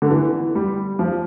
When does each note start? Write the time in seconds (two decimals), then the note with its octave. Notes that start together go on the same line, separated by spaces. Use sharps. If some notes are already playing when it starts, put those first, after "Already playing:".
0.02 D3
0.10 E3
0.55 G3
0.99 F3